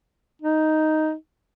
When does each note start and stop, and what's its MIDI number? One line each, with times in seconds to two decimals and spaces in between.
0.42 1.14 63